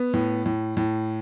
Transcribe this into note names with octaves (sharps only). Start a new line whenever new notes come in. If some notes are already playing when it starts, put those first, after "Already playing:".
Already playing: B3
A2
A2
A2